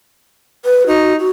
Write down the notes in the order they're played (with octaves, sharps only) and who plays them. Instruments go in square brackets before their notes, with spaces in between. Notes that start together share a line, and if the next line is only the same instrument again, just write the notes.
[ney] B4
[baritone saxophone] D#4 [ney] F#4
[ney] F#4